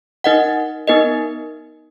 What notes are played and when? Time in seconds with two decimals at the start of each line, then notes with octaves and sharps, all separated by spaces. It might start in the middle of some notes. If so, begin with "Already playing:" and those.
0.24 D#4 A#4 D#5 F#5
0.87 B3 D#4 A#4 D#5